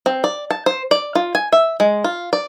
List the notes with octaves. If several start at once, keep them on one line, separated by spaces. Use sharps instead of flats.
C4
D5
A5
C5
D5
F4
G#5
E5
G#3
F4
D5